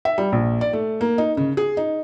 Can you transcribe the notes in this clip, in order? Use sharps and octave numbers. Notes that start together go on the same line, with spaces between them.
E5
G3
A#1
D5
A3
A#3
D#4
C#3
G#4
D#4